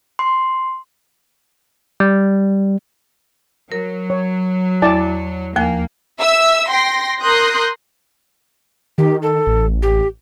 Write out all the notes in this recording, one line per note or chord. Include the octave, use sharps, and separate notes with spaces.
C6
G3
F#3 A#4
C#5
E2 E4 D5 A5
D#2 F3 A#3 G#5
E5 E6
G5 C6 A#6
A#4 C6 D#6 F#6 G6 A#6
D#3 G4
A4
A1
G4